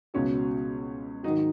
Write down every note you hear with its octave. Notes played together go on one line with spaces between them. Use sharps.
C#2 B2 F#3 C#4
G#2 D#3 F#3 D#4